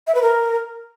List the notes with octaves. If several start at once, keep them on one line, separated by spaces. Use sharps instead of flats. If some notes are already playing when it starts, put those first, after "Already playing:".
E5
B4
A#4